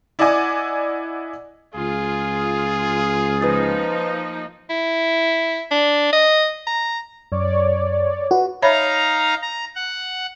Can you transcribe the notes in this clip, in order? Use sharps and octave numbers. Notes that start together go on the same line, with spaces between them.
E4 D5 D#5 F#5 G#5 D6
C#2 F4 G#4
F3 A#3 D#4 B4 D#6 A6
E4
D4
D#5
A#5
F#2 C#5 D5
F#4 B4
D#4 C#5 E5 F5 A#5 B5
A#5
F#5